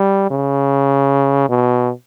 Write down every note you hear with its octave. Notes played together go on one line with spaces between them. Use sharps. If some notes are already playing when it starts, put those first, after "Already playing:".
Already playing: G3
C#3
B2